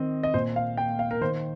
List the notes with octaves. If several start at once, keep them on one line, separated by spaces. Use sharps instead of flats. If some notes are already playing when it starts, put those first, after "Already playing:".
Already playing: D#3 C4 D#5
D#5
A#2 C5
F5
A#3 G5
F5
A#4
D#3 C5